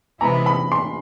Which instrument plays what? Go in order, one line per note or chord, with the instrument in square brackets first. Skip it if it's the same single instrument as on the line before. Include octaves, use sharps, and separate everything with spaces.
[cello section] C3 E3 G#3 B3 E4 [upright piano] A#5
[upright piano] B5
C6